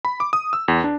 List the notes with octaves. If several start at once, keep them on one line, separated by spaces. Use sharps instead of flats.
B5
D6
D#6
E6
E2
D4